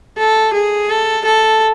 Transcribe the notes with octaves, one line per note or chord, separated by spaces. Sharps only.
A4
G#4
A4
A4